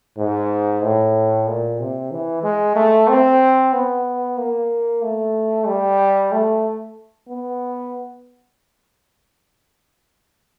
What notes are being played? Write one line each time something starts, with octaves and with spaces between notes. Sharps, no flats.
G#2
A2
A#2
C3
E3
G#3
A3
C4
B3
A#3
A3
G3
A3
B3